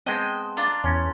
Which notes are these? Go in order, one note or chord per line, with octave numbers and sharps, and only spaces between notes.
G#3 B3 C4 D#5 G5 A5 C6 F#6
D4 F4 A#5 F#6 A6
E2 C#4 C6 G#6